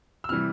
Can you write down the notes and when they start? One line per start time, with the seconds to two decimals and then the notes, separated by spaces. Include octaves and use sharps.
0.24 E6
0.29 C3 E3 G3 F6